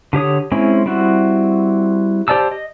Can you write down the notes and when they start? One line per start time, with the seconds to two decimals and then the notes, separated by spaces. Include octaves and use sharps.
0.13 D3 G4 C#5 D#6
0.52 G#3 C4 C#4 E4
0.86 G3 C4 E4 F#4
2.28 G4 C5 D5 A5 E6
2.51 D#5